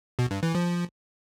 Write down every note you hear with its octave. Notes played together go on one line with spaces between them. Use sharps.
B2
G2
E3
F3